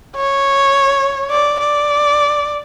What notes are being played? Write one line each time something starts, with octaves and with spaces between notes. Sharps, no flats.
C#5
D5
D5